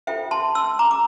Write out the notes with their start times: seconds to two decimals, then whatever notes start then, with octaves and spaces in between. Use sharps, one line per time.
0.07 F4 A4 C5 E5 G5
0.31 A5 C6
0.55 C6 E6
0.79 A#5 D6
0.91 D6